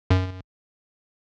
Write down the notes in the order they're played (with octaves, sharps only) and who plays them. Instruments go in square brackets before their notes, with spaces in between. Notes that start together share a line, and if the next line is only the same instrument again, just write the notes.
[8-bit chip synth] F#2